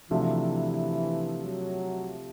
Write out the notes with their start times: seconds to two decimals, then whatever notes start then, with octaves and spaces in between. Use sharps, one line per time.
0.10 C3 E3 F3 A3 D4 F#4
1.44 F#3